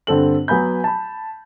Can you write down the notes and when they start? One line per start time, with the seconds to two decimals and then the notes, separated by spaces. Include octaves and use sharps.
0.07 G2 D3 C4 A4 F#7
0.48 F#3 B3 G#5 B5 G6
0.84 A5 B5